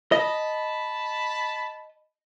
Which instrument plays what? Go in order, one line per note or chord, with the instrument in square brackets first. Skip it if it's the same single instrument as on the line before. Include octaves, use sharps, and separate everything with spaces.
[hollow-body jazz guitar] D#5 [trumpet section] A5 B5